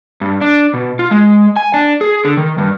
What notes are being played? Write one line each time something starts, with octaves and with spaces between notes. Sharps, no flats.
G2
D4
B2
F4
G#3
G#5
D4
G#4
D3
D#3
G2